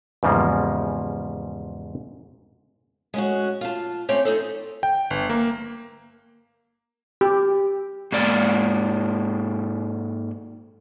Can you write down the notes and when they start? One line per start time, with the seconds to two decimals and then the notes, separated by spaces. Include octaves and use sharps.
0.23 E2 G#2 C#3 F3 G3 A#3
3.14 G#3 C#4 F#4
3.61 F4 A5
4.09 A3 C4 C#4 D#4 G4 C#5
4.25 D#4 G#4 A4
4.83 G5
5.10 G1
5.30 A#3
7.21 G4
8.12 G#2 A#3 D5